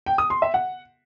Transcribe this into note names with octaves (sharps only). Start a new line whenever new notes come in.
G5
D#6
C6
E5
F#5